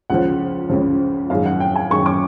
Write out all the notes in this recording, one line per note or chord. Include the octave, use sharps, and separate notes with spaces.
C#2 C#3 F3 F#5
C#2 C#3 F3
F#2 D#3 G#3 F5
F#5
G5
G#5
F#2 D#3 G#3 C#6
D6